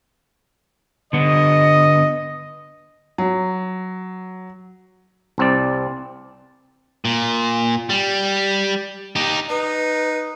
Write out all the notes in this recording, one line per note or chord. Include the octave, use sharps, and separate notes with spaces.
D3 B3 D#5
F#3
C2 C4 D5
A#2
G3
D#4 G4
D#4 B4